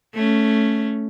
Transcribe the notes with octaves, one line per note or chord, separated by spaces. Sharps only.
A3 C#4